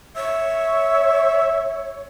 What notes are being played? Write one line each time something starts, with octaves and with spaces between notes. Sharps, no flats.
C#5 E5